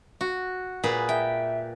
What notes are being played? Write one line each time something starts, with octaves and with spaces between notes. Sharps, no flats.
F#4
A#2 G#4 B4
E5 G5